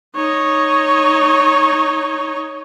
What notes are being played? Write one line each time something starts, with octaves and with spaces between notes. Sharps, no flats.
D#4 C#5